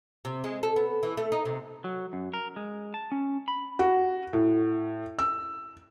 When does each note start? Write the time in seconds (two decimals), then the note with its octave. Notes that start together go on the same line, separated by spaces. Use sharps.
0.25 C3
0.44 G#3
0.63 A4
0.76 B3
1.03 E3
1.17 A3
1.32 D#4
1.45 C3
1.84 F#3
2.13 F#2
2.34 A#4
2.56 G#3
2.94 A5
3.12 C#4
3.48 B5
3.79 F#4
4.33 A2
5.19 E6